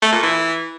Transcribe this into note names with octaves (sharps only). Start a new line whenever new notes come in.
A3
A#2
E3